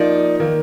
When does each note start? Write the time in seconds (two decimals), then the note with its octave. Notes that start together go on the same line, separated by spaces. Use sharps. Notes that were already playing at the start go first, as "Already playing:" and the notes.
Already playing: F3 A#3 D#4 D5
0.40 D#3 A#3